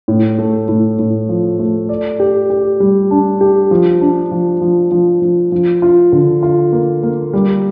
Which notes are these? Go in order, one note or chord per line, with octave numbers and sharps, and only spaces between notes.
A2
A3
A2
A2
F3
A3
D5
G4
G4
G3
D4
G4
F3
D4
F3
F3
F3
F3
F3
F4
D3
F4
A#3
A#3
G3